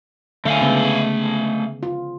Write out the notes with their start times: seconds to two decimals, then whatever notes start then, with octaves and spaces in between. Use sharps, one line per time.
0.45 D3 A3 F5 G#5
0.61 C#3 G#3 B3
1.83 F4